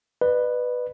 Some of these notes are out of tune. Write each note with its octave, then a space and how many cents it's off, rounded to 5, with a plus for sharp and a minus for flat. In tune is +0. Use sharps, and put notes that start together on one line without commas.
B4 +0 D5 +45